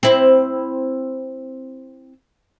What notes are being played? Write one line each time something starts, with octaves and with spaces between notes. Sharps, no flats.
C4 E4